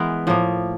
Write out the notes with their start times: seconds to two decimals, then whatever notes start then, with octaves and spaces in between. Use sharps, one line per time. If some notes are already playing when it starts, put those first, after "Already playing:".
Already playing: E3 G#3 B3 A#4
0.27 A2 F3 A#3